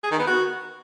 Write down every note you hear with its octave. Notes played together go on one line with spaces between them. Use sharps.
G#4
D#3
B3
F#4